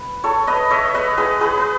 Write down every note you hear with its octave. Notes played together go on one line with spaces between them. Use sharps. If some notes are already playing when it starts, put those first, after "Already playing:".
Already playing: B4
A4 C#5
B4 D#5
C#5 E5
B4 D#5
G#4 B4
G#4 B4
B4